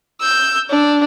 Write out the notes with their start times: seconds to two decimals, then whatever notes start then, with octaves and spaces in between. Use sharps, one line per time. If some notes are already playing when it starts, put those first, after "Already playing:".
0.21 E6 G6
0.70 D4